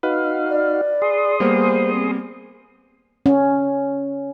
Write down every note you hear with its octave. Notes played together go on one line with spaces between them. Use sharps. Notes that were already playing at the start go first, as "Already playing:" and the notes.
D#4 F#4 B4 F5
D5
G#4 C6 D#6
G3 A#3 B3 C5
C4
C#4